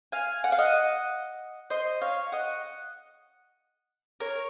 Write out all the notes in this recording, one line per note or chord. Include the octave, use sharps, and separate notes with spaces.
F5 G#5
F#5
F5
D#5 F#5
C5 D#5
C#5 F5
D#5 F#5
A#4 C#5